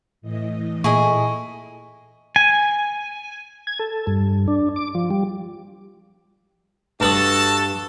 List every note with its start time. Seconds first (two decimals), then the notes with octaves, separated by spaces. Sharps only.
0.21 A2 E3 D#5
0.84 A#2 E4 G#4 A4 D#5 C#6
2.36 G#5
3.67 G#6
3.79 A4
4.07 G2
4.48 D4
4.76 D6
4.95 F3
5.10 G3
7.00 G2 F#4 A4 B4 A5 D#6